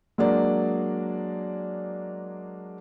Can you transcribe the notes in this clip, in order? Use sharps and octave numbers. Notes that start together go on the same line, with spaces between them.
F#3 G#3 A#3 D4 D5